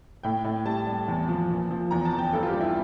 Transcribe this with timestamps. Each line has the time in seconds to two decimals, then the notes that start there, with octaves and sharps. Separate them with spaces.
0.23 A2 G5
0.44 A2
0.66 G3 A5
0.87 G3
1.08 E2
1.29 F3
1.50 A#2
1.71 F3
1.91 E2 A#5
2.05 A5
2.13 E2
2.19 G5
2.33 G2 A4
2.43 F4
2.47 G4
2.54 G3
2.61 E4